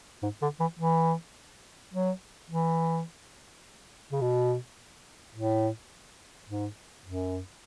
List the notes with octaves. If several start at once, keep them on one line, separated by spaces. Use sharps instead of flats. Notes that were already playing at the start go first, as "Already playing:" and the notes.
G#2
D3
E3
E3
F#3
E3
C#3
B2
A2
G#2
F#2